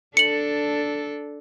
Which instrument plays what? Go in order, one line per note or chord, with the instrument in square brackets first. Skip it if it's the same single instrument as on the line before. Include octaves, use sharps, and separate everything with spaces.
[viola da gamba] D4 A4 [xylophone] C#7 F#7